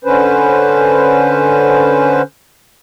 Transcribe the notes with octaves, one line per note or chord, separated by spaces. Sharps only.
D3 C#4 B4 C5